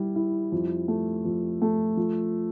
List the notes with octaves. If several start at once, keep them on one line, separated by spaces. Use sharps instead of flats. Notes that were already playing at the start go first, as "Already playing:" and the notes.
Already playing: G3 E4
E4
F2
A3
F2
A3
F3